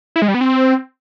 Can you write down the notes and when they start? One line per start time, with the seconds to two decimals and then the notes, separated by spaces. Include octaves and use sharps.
0.16 E4
0.22 G#3
0.28 G3
0.34 B3
0.41 C4